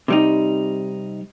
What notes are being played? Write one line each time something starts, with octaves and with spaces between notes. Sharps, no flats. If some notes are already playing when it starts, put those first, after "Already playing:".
C3 G3 D#4